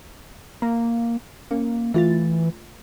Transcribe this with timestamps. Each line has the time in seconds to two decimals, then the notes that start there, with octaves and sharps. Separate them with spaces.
0.62 A#3 A#5
1.51 A#3 C#4
1.94 E3 A3 F4 A6